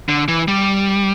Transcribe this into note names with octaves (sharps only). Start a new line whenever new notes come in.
D3
E3
G3